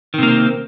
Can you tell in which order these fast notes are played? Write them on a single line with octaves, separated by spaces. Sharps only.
D#3 C3 A#3 C4